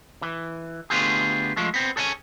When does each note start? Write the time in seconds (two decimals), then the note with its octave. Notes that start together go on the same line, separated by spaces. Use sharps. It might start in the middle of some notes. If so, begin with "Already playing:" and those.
0.22 E3
0.90 D3 A3 B3 F4 G4 G#4
1.57 F3 G#3 A3
1.74 B3 C4
1.96 G#4 A4 C#5 F5 G#5